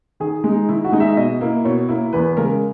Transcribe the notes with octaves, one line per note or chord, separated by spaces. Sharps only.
D#3 G#4
G#3 D#4
D#3 E4
F#4
G#3 D#4
E5
B2 D#5
A#3 E4
B2 C#5
A#3 E4
E2 B4
C#3 G#3 A#4